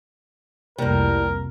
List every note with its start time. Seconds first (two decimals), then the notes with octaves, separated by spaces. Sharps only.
0.78 C2 F2 A2 C3 G3 A#3 A#4